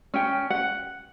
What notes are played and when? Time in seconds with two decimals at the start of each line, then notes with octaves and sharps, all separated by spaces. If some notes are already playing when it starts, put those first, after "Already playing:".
0.14 C#4 G5
0.50 F#5